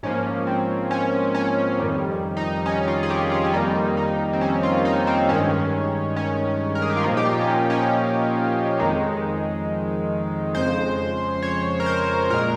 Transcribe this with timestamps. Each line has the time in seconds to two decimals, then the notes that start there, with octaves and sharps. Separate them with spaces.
0.03 G#2 F3 A#3 C#4
0.47 C4
0.91 C#4
1.35 C#4
1.78 F2 D#3 G3
2.37 D#4
2.66 C#4
2.88 F4
3.03 G#4
3.10 G4
3.32 F4
3.44 C#4
3.54 F2 D#3 G3 A#3 D#4
3.97 D#4
4.33 C4
4.41 C#4
4.63 F4
4.85 D#4
5.07 C4
5.29 G2 D#3 G#3 C#4
6.16 C#4
6.75 A#4
6.82 G#4
6.89 G4
6.97 F4
7.04 A#2 F3 A#3 D#4
7.17 G4
7.26 F4
7.40 C#4
7.48 D#4
7.70 C#4
8.79 F2 D#3 G#3 D#4
10.55 F2 C#3 G#3 C5
11.42 C#5
11.80 A#4
11.86 C5
12.30 A#2 G#3 A#4